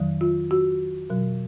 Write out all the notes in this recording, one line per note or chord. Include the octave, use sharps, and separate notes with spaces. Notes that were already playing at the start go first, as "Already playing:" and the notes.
Already playing: F2 D#3 F#3
F4
F#4
B2 F#3